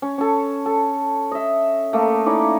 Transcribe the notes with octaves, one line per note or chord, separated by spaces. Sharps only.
C#4
C#4 A4
A4
D#5 E5
A3 A#3
C#4 D#4 E4 D5